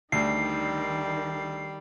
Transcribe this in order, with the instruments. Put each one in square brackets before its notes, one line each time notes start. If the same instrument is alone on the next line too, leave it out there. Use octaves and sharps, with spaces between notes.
[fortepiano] D2 [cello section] D#3 [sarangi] G3 [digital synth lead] C7